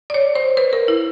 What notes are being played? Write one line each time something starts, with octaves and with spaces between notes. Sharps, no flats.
D5
C#5
C5
B4
A#4
E4